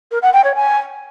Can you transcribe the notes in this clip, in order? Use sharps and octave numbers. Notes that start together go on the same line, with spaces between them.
A#4
F#5
G5
C#5
G#5